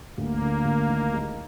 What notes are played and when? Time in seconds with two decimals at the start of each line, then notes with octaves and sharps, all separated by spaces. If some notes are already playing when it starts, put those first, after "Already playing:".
0.17 D2 A#3
0.41 D3
0.65 D2
0.90 D#3
1.14 G#3